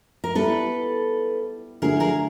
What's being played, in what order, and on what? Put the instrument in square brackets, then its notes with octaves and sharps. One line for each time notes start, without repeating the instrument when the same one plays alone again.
[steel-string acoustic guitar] A#4
[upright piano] G3 B3 E4 [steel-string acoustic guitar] A4 B4
[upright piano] D3 F#3 A3 [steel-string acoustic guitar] G#4 A#4
[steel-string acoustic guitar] G#4 A#4